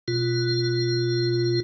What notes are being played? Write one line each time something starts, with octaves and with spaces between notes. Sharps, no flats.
B2 F4